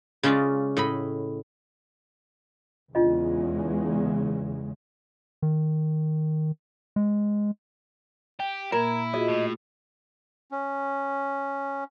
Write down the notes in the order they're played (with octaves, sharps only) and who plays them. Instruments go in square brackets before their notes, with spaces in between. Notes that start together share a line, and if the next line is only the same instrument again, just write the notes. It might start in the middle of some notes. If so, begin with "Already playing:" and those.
[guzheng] C#3 G#3 C#4 F4 D5 D#5
A2 D#5 B5
[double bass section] E2 C#3 G#3 [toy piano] D4 F4 D#5
[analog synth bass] D#3
G#3
[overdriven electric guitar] G4 [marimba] G5
[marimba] A#2 A#3 G#6 [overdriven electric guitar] E4 [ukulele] A#4
[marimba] F4 F#4 G#4 [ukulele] D#5
[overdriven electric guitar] A2
[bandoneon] C#4